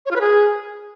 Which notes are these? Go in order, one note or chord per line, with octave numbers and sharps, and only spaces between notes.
C#5
F4
B4
G#4